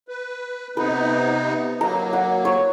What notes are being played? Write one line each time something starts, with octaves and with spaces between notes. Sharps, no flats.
B4
C3 B3 D#4 B4
F#3 A#3 A#5
F#5
C#5